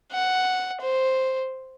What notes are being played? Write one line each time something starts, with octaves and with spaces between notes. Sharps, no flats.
F#5
C5